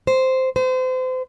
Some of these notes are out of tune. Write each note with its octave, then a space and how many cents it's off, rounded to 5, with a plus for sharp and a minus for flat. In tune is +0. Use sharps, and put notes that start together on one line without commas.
C5 -5
C5 -35